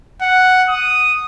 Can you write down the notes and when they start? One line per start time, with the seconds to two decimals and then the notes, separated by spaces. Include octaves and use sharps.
0.21 F#5
0.69 D#6